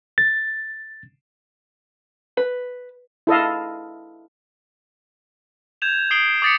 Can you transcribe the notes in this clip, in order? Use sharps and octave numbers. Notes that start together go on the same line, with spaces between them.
A6
B4
E4 A4 D#5 F5
G6 G#6 E7 F7
D#6 C7 D7 G7
D6 D#6 A6 B6 C#7